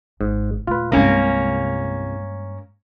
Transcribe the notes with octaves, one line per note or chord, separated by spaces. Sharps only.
G#1 G#2
D#1 A3 F4 B4
C2 G2 G#3 A#3 C#4